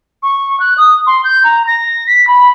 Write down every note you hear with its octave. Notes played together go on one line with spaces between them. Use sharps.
C#6
F#6
D#6
C6
G6
A#5
A#6
B6
B5